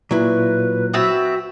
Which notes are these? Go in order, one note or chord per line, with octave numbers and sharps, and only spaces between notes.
A#2 F#3 E4 B4
B3 C4 F#4 E5